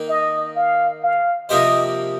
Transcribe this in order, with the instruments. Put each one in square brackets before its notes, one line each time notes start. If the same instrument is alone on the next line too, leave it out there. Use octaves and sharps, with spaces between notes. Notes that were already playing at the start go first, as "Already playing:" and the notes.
Already playing: [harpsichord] D#3 A#3 D#4
[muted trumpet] D#5
F5
F5
[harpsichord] C3 F3 A#3 G4 C5 [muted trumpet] D#5